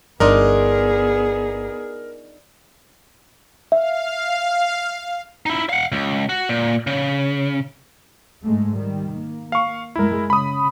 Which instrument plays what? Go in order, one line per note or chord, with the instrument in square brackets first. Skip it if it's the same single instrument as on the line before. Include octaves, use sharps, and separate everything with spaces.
[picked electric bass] G1 [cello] B3 G#4 [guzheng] D4 D#4 F4 [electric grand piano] A#4
[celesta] E5 [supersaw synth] F5
[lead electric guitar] D#4 E4
F5 F#5
C#2
F#4
A#2
C#3
[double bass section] G#2 G#3 A3
D#3 G3
A#3
[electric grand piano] F5 C#6
[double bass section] F#2 G#3 [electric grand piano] E4 A#4
[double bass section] C#3 [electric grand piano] B5 D#6